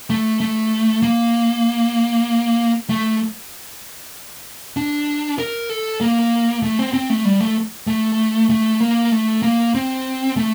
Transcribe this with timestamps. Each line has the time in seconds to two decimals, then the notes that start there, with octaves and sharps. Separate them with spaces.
0.10 A3
0.40 A3
1.03 A#3
2.90 A3
4.77 D4
5.39 A#4
5.70 A4
6.01 A#3
6.63 A3
6.79 C4
6.94 C4
7.10 A3
7.25 G3
7.41 A3
7.87 A3
8.50 A3
8.81 A#3
9.12 A3
9.42 A#3
9.75 C4
10.36 A3